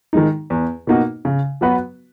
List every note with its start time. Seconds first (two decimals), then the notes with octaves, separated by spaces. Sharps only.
0.13 D#3 G#3 D#4
0.50 E2
0.87 B2 A#3 D#4 F#4
1.25 C#3
1.61 F#3 B3 F#4 B4